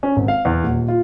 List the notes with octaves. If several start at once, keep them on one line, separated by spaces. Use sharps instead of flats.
C#4
G#1
F5
E2
D#1
F4